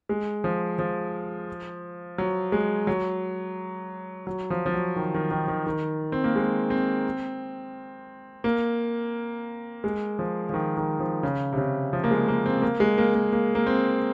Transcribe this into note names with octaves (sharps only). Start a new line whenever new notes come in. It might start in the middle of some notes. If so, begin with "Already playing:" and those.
G#3
F3
F3
F#3
G#3
F#3
F#3
F3
F3
F#3
D#3
D#3
D#3
D#3
D#3
C4
A#3
G#3
C4
A#3
G#3
F3
F3
D#3
D#3
F3
C#3
C3
C#3
F3
A#3
G#3
A#3
C4
A#3
G#3
A#3
A#3
A#3
A#3
C4